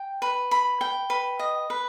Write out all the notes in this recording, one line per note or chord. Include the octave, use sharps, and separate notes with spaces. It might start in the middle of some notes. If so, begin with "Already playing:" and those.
Already playing: G5
B4
B5
G5
B4
D#5
B4